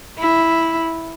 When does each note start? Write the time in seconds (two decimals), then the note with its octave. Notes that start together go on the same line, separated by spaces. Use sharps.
0.19 E4